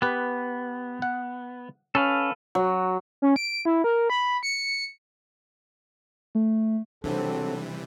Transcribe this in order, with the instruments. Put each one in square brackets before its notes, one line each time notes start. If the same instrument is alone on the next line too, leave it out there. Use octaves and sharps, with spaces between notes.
[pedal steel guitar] B3 [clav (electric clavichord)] G4 B4
[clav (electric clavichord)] F#5
[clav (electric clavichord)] C#4 [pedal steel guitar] A4 B4 F5
[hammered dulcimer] F#3
[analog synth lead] C#4
D7
E4
A#4
B5
C#7
[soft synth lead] A3
[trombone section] G#1 F#3 A4 [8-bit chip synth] C3 E3 G3 [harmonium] C4 [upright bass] D4